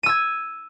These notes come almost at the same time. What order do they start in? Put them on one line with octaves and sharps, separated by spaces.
D#7 E6 G#6